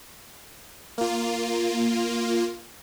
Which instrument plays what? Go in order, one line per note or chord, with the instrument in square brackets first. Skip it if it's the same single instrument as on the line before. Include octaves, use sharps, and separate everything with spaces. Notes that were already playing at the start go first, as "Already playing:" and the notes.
[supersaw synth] A#3 F4